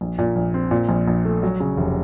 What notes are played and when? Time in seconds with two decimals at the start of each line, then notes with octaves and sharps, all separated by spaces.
0.01 A#1
0.18 A#2
0.36 A#1
0.54 C4
0.71 A#2
0.89 A#1
1.08 A#1
1.25 A3
1.43 F#3
1.60 C#3
1.77 F1